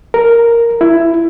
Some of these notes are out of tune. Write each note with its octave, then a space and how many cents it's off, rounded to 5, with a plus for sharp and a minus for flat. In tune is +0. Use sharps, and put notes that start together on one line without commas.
A#4 +0
E4 +10